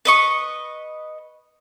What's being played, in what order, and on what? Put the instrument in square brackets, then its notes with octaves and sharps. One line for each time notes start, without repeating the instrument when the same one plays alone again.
[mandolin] B4 D#5 C#6